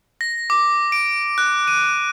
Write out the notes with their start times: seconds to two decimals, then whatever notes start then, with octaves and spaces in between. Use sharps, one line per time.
0.21 A#6
0.50 D6
0.92 D7
1.38 F#6
1.68 D#7